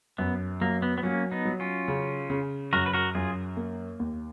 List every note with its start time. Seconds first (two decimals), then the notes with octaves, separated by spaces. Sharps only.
0.18 F#2 B3
0.61 F#3 A#3
0.82 B3
0.98 B3
1.03 F#3 A#3 C#4
1.31 B3 D#4
1.45 F#3
1.60 C#4 F4
1.88 C#3
2.30 C#3
2.73 F#2 F#4 A#4
2.86 B4
2.93 F#4 A#4
3.15 F#2 F4 G#4
3.57 A#3
4.00 D#2